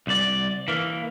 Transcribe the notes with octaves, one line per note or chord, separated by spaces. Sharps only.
C2 D5
E3 A#3